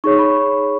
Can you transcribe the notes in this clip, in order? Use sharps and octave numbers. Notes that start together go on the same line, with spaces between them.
D#4 G#4 C#5 C#6
B5